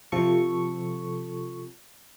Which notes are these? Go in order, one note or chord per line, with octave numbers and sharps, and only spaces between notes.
C3 F3 A4 C#6